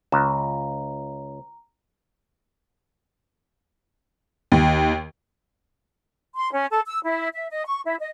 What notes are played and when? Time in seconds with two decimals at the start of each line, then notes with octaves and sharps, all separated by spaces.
0.12 C#2 A#5
4.52 D#2
6.35 C6
6.52 C#4
6.71 A4
6.86 E6
7.04 E4
7.34 E5
7.51 D#5
7.66 C#6
7.85 E4
8.00 D#5